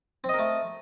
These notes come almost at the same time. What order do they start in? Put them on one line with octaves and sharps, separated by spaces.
C4 D#5 A#4 A3